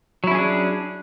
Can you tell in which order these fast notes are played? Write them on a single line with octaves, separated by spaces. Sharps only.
F#3 E4 C#4 G#4 D4